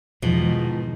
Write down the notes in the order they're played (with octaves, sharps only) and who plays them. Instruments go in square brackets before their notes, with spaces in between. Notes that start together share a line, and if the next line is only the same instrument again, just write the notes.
[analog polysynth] E2 [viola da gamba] G#2 D#3 [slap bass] B2 [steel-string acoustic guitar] F3